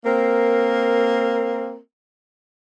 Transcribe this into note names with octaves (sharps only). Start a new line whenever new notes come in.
A#3 C4 A#4